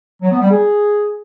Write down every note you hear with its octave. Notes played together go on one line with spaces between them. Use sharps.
F#3
B3
G3
G#4